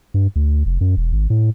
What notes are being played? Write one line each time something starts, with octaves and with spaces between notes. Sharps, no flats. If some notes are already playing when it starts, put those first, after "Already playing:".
G2
D2
F1
F#2
E1
G#1
A2